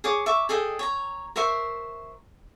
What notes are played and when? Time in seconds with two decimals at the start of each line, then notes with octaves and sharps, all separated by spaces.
0.04 G#4 C#5 D6
0.26 E5 C#6 D6
0.49 G#4 A4 D#5 G5
0.79 C#5 A#5
1.36 A#4 C5 E5 C#6